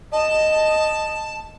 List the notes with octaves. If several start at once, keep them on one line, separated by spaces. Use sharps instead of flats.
D#5 A5